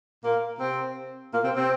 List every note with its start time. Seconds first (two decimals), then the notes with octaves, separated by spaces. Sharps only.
0.24 A#2 A#3
0.60 C3 C4
1.32 A#2 A#3
1.44 C3 C4
1.56 C3 C4